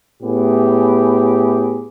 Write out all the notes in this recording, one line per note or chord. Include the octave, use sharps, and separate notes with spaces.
A2 B3 G4 G#4